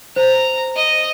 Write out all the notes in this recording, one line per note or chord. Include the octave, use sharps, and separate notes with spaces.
C5 A#5
D#5